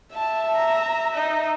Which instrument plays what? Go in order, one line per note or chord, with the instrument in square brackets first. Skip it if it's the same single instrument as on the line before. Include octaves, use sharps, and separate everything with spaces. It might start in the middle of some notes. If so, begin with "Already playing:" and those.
[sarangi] E5 [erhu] A5
[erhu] A#5
D#4